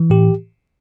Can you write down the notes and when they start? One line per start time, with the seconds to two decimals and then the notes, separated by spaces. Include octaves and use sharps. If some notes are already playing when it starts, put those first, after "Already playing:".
Already playing: E3
0.10 A2 G4